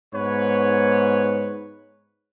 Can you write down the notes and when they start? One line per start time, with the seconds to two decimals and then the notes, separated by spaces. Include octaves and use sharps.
0.14 G#2 B3 B4 C#5